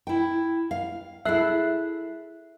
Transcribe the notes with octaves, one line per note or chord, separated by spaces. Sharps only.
E4 G5
F5
E4 G#4 A4 E5 F#6 C7